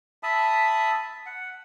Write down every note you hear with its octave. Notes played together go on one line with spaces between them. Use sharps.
E5 A5 B5 D#6
F#5